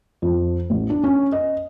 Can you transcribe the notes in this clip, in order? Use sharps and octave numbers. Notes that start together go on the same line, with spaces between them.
F2
A1
D4
C#4
D#5